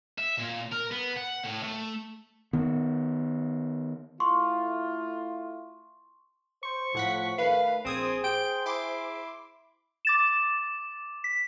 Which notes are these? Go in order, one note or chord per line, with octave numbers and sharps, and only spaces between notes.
E5
A#2
A#4
B3
F#5
A2
A3
D#3 B3
A3 E4 F4 C6 C#6
C5 C#6
A2 F3 F#5 B6
D#2 D#3 A3 B4 F5
A#1 C4 G#4 C5 D#6 G#6
G5 D7
E4 C6 D6
D6 A6 E7
B6